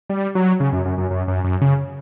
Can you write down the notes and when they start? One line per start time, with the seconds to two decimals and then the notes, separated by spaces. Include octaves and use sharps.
0.09 G3
0.35 F#3
0.60 C#3
0.73 F#2
0.85 F#2
0.98 F#2
1.11 F#2
1.28 F#2
1.44 F#2
1.61 C#3